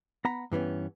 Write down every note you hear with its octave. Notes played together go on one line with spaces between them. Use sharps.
B3 F#5 A#5 B5
G2 E3 B3 C#4